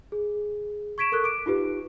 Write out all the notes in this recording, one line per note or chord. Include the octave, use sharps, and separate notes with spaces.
G#4
C#6 G#6 B6 D7 E7
A4 A#4 C#6 F#6
D6 D7
D#4 F4 G4 B4